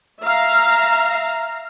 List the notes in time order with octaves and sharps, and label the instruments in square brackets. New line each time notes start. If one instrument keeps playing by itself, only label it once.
[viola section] E5 F5 A#5